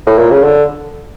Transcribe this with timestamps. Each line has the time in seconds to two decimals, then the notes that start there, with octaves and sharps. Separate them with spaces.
0.06 A2
0.18 A#2
0.31 C#3
0.43 D3